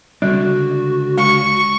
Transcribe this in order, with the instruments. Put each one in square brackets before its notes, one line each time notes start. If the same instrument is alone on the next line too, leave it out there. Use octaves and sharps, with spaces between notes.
[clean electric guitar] C#2 D3 D4 [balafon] G3 [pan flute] F#4
[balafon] G#3 [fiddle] C#6